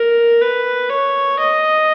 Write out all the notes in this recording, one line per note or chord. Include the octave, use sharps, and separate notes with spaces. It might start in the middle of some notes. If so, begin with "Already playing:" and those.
Already playing: A#4
B4
C#5
D#5